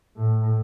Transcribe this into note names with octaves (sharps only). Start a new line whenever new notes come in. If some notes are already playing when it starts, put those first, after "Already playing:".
A2